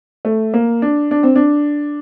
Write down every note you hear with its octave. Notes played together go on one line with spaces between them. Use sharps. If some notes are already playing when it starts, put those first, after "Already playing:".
A3
A#3
D4
D4
C4
D4